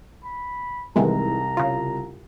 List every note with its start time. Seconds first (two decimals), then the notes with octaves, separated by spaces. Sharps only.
0.24 B5
0.96 C2 D#3 E3 G#3 A#5
1.57 C#3 F4